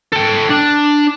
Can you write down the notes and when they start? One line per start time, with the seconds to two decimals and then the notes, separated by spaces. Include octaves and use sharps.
0.12 A4 G5
0.49 D4